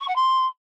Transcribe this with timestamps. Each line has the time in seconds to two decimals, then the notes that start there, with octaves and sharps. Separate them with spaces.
0.01 C#6
0.08 F#5
0.16 C6